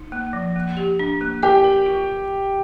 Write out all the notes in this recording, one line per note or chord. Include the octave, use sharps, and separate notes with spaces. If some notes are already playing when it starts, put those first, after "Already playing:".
Already playing: D#4
A#3
F3
A#3
G4
D4
A#3
G4 D5 G5
A#4
F4